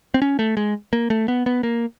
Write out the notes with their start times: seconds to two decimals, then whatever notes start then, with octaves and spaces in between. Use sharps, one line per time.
0.14 C4
0.22 C#4
0.39 A3
0.57 G#3
0.93 A#3
1.10 A3
1.28 B3
1.46 B3
1.63 A#3